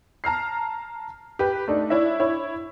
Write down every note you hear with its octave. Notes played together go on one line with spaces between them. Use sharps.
A5 A#5 F6 C7
G4 B4
A3 D4 D#4
D4 E4 C#5 E5
E4 C#5